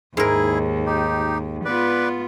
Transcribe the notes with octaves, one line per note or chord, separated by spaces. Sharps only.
D#2 G#2 E4 G#4 A#4
D#4 G4
B3 F4 B4 D5